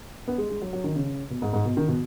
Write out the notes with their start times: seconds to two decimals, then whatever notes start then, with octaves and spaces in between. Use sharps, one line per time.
0.28 B3
0.38 G#3
0.50 G#3
0.62 F#3
0.73 F#3
0.84 D#3
0.96 C#3
1.30 B2
1.42 G#2
1.53 G#2
1.65 B2
1.77 D#3
1.88 B2